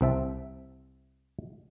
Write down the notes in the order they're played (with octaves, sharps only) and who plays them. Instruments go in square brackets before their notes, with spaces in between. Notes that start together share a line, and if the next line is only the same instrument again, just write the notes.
[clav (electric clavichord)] C2 C4 E5 A5